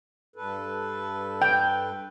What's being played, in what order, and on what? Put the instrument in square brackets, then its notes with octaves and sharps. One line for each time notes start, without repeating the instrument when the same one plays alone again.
[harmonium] G2 A4 B4
[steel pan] G5